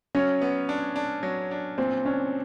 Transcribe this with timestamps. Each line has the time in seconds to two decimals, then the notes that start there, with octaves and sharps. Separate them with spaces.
0.15 F#3 C#4
0.41 B3
0.69 D4
0.96 D4
1.23 F#3
1.51 D4
1.78 A#2 C4
2.05 C#4 D4